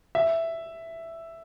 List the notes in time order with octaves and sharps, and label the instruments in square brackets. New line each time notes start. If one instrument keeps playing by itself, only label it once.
[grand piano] E5